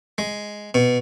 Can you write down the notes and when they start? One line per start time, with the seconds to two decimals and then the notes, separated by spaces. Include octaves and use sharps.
0.18 G#3
0.74 B2